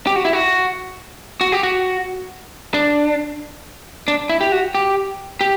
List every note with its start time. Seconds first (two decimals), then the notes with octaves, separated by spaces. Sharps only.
0.07 G4
0.16 F#4
0.25 E4
0.33 F#4
1.41 F#4
1.52 G4
1.63 F#4
2.74 D4
4.08 D4
4.29 E4
4.41 G4
4.52 F#4
4.75 G4
5.41 G4